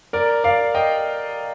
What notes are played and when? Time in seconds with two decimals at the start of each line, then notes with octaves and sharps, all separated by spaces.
0.13 A#4 D5
0.44 D5 F5
0.75 D#5 G5